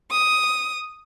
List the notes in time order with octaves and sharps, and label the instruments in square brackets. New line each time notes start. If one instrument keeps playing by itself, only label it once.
[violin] D#6